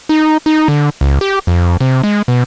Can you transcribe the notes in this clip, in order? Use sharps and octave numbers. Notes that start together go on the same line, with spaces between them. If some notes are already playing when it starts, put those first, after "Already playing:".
D#4
D#4
D3
C#2
G4
F2
C3
G#3
B2